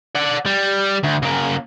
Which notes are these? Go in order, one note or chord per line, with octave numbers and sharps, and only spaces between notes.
D5 F#5
G3
D2
C#3 A#3